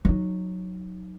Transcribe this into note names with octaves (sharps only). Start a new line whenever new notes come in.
F#3 D#4